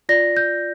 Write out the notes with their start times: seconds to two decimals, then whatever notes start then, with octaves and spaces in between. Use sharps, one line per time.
0.09 F4 D5 A#6
0.37 G6